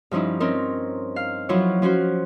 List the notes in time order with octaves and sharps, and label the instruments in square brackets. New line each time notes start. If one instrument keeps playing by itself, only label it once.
[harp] G2 F3 C#4 D#4 E4
C4 C#4 D#4 A#4
F5
F3 F#3 E4 F4 C#5
F3 C#4 F#4 C5